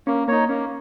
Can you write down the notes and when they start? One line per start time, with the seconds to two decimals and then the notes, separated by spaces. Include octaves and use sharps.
0.07 A#3 C#4
0.28 A#3 D#4 C#5
0.48 A#3 C#4